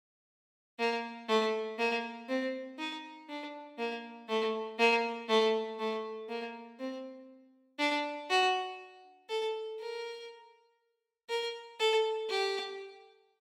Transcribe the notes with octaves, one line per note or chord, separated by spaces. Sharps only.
A#3
A3
A#3
C4
D#4
D4
A#3
A3
A#3
A3
A3
A#3
C4
D4
F#4
A4
A#4
A#4
A4
G4